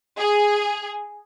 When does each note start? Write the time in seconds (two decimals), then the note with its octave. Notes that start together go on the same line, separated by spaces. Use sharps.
0.18 G#4